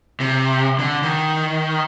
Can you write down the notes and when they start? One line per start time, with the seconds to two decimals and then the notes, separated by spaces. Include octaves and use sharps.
0.20 C3
0.79 D3
1.03 D#3